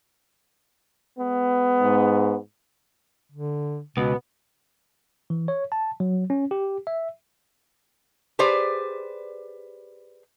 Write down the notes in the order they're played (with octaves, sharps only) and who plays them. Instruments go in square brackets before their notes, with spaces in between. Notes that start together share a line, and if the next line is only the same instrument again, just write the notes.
[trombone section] G#3 B3
[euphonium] G#2
[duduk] D3
[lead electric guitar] C#2 [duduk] B2 [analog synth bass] B3
[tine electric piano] E3
C#5
A5
F#3
C#4
G4
E5
[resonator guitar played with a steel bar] G4 G#4 B4 C5 D5